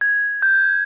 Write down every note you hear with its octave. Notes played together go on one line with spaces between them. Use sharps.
G#6
G6